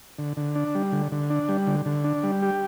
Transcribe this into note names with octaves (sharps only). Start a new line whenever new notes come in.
D3
D3
D4
G3
D3
D3
D4
G3
D3
D3
D4
G3
G4